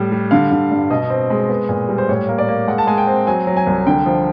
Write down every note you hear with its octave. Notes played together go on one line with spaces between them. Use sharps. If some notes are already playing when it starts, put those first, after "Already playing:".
Already playing: A2 G3
G3
D3 F5
D3
G2
B2 D#5
C4
G#3
B3
A#2
G3
C5
A2 C#5
A#3
D5
A#3
G#3 F#5
A5
G#3 G#5
G5
C4
F#3 G#5
F#3
G#5
C2
D3 G5
F3